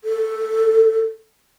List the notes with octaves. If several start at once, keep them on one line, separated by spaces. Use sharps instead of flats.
A4